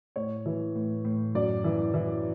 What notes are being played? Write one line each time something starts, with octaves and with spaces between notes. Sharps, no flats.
A2 C#5
E3
A2
A2
F#2 D5
E3
E3